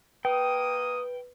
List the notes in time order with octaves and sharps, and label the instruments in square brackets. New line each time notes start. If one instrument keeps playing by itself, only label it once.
[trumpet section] A#3 D#6 [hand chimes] B4 [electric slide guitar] G5